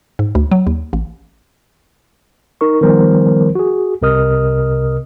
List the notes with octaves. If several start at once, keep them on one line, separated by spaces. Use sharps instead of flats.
G#2
D2
F#3
D#2
A1
D#4 A#4 C#6
D#3 F3 G3 B3 A#4 C5
F#4 G#4
C2 C3 A#4 D#5 D#6 F6